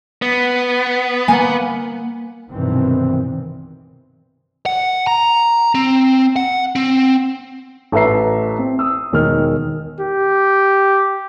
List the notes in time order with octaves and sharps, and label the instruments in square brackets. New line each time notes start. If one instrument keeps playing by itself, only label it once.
[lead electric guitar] B3
[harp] A#3 [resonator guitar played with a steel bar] G#5
[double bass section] B1 G2 C3 D#3 E3 C4
[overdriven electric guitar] F#5
A#5
C4
F#5
C4
[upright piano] A1 A4 B4 E5 A#5 C7
C4
D#6 E6
E1 D#3 D#4 F6
[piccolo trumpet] G4